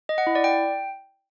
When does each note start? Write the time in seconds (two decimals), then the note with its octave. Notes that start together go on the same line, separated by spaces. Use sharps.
0.09 D#5
0.18 F#5
0.27 E4
0.35 D5
0.44 G5